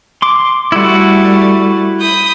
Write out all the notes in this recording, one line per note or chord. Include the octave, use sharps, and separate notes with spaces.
C6 D6
G3 A3 E4 F#4
B5 D#6 G6